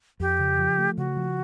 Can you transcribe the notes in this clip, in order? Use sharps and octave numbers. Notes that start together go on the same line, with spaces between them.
F2 G4
C#3
F3
A3
C#3 F#4
F3